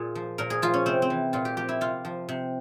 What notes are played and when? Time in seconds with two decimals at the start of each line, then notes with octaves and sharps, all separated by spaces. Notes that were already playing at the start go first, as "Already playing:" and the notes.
Already playing: A#2 F4 G#4
0.15 F3
0.38 A#2 A#4
0.50 G#4
0.62 F3 F4
0.74 C#4
0.86 C3 C4
1.02 C4
1.10 E3
1.33 A#2 F4
1.45 G4
1.57 F3 G4
1.69 E4
1.81 C3 F4
2.05 F3
2.29 C3